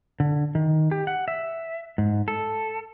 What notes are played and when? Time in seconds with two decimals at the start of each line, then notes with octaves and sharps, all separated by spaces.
0.20 D3
0.55 D#3
0.91 G4
1.07 F#5
1.28 E5
1.98 G#2
2.28 A4